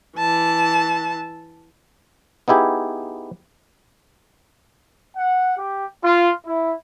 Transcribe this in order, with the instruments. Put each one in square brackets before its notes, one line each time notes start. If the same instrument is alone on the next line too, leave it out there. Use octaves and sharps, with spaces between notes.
[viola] E3 A5
[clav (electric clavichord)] B3 D#4 E4 G4 G#4
[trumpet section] F#5
G4
F4
E4